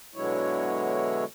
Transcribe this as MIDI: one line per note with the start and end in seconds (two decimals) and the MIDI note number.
0.14 1.24 47
0.14 1.24 50
0.14 1.24 54
0.14 1.24 56
0.14 1.24 64
0.14 1.24 73